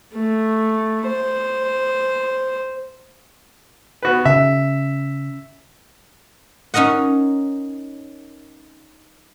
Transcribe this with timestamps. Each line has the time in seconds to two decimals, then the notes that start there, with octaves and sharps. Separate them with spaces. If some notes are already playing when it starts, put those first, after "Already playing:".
0.15 A3
1.07 C5
4.03 B3 F#4 B4
4.25 C#3 E5
6.74 C#4 D#4 A#4 D#5 F#5